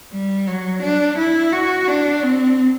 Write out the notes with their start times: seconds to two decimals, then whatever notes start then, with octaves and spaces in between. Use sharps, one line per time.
0.12 G3
0.48 F#3
0.82 D4
1.18 E4
1.52 F#4
1.88 D4
2.23 C4